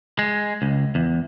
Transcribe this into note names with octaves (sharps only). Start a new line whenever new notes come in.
G#3
C#2
E2